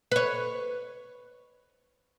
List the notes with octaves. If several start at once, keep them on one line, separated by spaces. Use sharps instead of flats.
B4 C#5